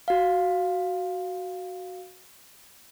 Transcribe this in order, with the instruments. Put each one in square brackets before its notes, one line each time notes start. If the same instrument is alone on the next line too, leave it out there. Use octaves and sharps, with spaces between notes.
[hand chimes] F#4 F5